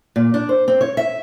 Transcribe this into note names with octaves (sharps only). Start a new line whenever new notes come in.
A#2
D4
C5
C4
C#5
E5